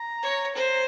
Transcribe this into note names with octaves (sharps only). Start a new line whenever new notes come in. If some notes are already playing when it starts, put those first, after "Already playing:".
Already playing: A#5
C#5
C5 A#5